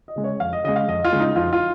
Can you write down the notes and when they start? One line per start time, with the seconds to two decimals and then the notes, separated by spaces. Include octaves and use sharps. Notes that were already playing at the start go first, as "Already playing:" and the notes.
0.08 D#5
0.16 C#3 G#3
0.24 C#5
0.40 F2 F5
0.53 D#5
0.64 C#3 G#3 D#5
0.76 F5
0.88 F2 D#5
1.04 F4
1.12 C#3 G#3
1.20 D#4
1.36 F2 F4
1.53 F4